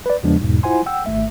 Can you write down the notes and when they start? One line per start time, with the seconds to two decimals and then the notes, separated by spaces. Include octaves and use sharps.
0.06 B4 D5
0.23 E2 C#3 F3 G#3 B3 D4
0.40 E2 G#2 B2
0.63 E4 F4 C5 F#5 G#5 C6
0.86 F#5 G5 E6
1.06 G#1 A3 E5